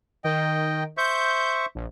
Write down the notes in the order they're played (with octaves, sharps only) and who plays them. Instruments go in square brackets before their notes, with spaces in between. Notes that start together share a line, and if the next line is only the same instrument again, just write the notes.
[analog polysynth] D#3 [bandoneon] D#5 G5
[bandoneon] C5 E5 C#6 [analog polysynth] G6
[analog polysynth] A#1